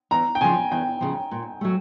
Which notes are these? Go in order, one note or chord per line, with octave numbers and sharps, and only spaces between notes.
E2 A#5
G5
C#3 F3 G#5
E2 G5
C#3 F3
A#2
F#3 A3